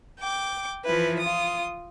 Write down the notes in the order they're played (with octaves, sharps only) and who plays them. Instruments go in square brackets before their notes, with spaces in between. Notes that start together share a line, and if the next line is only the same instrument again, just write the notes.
[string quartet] G5 D6
E3 F3 E4 B4
F4 D#6